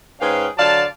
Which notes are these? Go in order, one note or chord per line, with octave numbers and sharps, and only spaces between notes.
G#2 C#4 G#4 B4 F5 G5
D3 F#3 D5 F5 A5